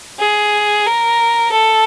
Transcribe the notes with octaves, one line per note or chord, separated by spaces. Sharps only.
G#4
A#4
A4